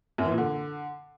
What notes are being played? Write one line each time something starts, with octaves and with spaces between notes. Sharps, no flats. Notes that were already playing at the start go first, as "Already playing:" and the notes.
F#2
E3
A#2
D3